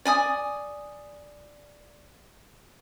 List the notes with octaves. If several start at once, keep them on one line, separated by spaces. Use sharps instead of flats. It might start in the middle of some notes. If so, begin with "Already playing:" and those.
D5 G#5 D#6